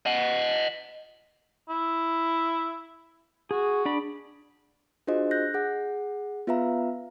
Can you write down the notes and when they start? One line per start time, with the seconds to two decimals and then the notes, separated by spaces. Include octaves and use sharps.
0.06 D#5 F#5
1.69 E4
3.51 F#4 G#4
3.85 D4 D5 B5
5.07 D4 F4 F#4 G#4 C5 D#5
5.31 F#6 G6 A#6
5.54 G#4 F#5
6.47 B3 F4 B4 E5 F5 A#5